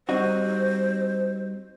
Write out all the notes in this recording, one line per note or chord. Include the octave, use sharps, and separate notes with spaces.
G3 C4 D#4 F#4 C5